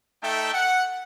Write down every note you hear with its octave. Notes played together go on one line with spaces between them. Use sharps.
A3 D#4 A4 E5 G5
F#5